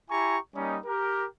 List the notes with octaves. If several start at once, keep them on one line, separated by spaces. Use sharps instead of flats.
E4 G4 G#5 A#5 C#6
G3 A#3 C#4 D#4
G4 A#4